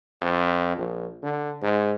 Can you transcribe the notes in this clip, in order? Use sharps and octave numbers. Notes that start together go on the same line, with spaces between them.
F2
A#1
D3
G#2